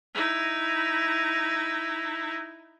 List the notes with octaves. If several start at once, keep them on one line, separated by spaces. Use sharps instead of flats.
D#4 E4